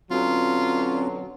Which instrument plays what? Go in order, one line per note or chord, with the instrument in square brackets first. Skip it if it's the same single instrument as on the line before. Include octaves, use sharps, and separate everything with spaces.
[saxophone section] B2 D3 F#3 [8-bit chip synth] C4 C#4 [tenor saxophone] F4